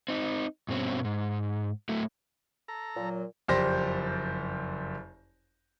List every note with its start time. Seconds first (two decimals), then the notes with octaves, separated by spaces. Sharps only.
0.08 C4 D#4
0.69 G2 B2 C4 C#4
1.05 G#2
1.89 A2 F#3 A3
2.68 A4 A#5
2.96 A#2 F#3
3.48 F#1 F2 G4 C5 D5 A#6